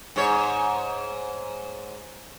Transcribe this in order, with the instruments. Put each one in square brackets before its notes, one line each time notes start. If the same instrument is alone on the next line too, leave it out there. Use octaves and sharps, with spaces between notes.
[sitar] G#2 C#5